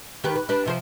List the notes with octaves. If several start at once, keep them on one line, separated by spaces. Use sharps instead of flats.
D#3 G4 B4
B4
D4 G4 B4
C3 F3 C5